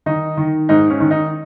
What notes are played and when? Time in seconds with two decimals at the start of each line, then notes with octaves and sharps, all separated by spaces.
0.06 D#3 D#4
0.37 D#3
0.69 G#2 D#4
0.90 C#4
1.00 D#3
1.11 D#4